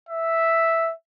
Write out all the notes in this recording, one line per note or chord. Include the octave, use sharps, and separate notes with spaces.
E5